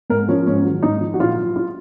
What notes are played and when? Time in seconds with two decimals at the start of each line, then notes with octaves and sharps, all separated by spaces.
0.10 G#2 A#4
0.28 F3 C#4
0.46 G#2 C#4
0.65 D#3 F#3
0.83 G#2 D#4
1.01 F3
1.14 F#4
1.19 A#2 F4
1.38 F#3
1.56 F4